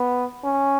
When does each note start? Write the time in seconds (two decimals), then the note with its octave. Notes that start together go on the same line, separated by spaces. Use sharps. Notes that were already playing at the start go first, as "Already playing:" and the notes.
Already playing: B3
0.44 C#4